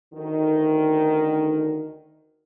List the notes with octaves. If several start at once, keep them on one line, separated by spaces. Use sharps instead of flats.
D2 D#3